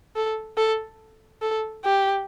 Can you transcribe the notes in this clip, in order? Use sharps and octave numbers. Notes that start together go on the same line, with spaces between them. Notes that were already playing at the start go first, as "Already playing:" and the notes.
A4
A4
A4
G4